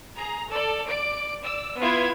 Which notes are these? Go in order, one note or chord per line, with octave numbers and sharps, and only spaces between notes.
G#4 A#5
A4 D5
D5 D7
D5 E6
B3 E4 F4 B4 G#6